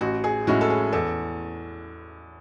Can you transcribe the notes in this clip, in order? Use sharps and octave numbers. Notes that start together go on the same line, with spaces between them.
A1 F#4
G#4
A2 G#3 C#4 E4 F#4
A4
G#4
E2 A4